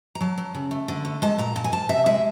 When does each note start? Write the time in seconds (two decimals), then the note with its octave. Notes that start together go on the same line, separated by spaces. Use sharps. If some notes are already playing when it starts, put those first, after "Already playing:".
0.15 A#5
0.21 F#3 A5
0.38 F#3
0.54 C#3
0.71 A3
0.88 D3
1.05 A3
1.22 G#3 A5
1.38 A#2 A#5
1.56 A#2 A5
1.64 G#5
1.72 D2 A5
1.89 C3 E5
2.06 G#3 E5